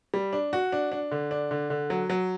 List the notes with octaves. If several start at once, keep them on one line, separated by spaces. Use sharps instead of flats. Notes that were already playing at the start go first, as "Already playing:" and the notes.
G3
D4
F#4
D4
D4
D3
D4
D3
D3
F#3
F#3